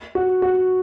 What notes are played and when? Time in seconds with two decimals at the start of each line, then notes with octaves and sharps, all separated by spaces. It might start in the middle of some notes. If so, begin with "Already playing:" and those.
0.15 F#4
0.42 F#4